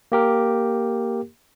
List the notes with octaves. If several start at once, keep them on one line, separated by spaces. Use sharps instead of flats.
A#3 G4 A#4